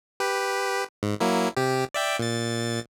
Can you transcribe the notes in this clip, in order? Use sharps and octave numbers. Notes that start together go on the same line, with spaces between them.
G4 B4
G#2
F#3 A#3 E4
C3 G4
D5 E5 G5
A#2 A6